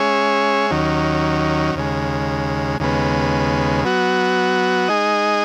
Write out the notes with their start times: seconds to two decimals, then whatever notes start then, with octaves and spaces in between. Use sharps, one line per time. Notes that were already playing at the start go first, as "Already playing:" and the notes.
Already playing: G#3 C#4 G#4 C#5 E5
0.70 D#2 D#3 F#3 C#4
1.75 D#2 C#3 G#3
2.80 D#2 C#3 G#3 B3
3.85 F#3 B3 F#4
4.88 G#3 D#4 G#4 D#5